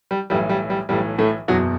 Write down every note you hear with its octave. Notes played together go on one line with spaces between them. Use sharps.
G3
B1 A2 E3 G3
G3
G3
B1 A2 E3 G3
A2 A3
F#1 E2 B2 F#3 F#4